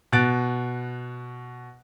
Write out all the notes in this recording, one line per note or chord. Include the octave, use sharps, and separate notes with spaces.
B2 F#6 A6 D7